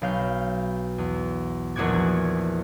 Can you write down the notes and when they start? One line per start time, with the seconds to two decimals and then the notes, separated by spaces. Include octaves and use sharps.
0.02 B1 F5 G6
0.98 E2
1.76 A#1 E2 G#3 F#4 D6 G#6